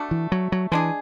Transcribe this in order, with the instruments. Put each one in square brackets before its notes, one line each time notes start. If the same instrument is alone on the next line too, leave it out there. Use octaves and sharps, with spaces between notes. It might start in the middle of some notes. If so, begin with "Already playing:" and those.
Already playing: [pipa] A3 D4 F#4
[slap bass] E3
F#3
F#3
[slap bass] E3 [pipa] G#3 D4 G#4